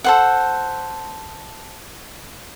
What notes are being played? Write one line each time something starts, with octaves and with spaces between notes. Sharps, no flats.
A4 C5 F#5